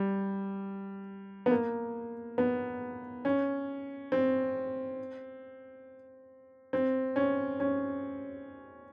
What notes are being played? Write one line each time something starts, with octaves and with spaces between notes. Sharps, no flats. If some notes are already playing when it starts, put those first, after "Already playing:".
Already playing: G3
B3
A#3
B3
C#4
C4
C4
C#4
C#4